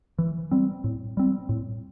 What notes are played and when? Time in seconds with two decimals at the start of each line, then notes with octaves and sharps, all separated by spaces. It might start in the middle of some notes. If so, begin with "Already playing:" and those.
0.19 E3
0.51 G3 C4
0.84 A2
1.17 G3 C4
1.49 A2